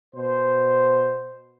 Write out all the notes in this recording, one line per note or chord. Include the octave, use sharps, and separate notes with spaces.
B2 C5